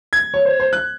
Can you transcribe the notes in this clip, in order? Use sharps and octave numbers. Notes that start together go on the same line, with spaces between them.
G#6
C#5
C5
C5
F#6